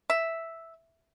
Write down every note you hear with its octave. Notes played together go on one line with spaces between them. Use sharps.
E5